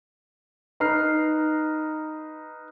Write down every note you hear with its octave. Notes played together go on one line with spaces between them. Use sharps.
D#4 B4 A#5 F6 C7